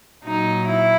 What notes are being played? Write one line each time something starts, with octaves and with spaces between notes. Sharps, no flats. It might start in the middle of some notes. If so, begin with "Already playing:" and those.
A#2 F#3 D#4
E4